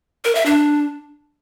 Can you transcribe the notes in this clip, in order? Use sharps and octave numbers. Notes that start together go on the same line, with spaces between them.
A#4
E5
D4